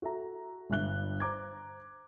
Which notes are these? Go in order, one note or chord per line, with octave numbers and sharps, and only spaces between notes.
F#4 A4 E5 A#5
G1 G2 E5 F#6 G7
C5 A#5 D6 G#6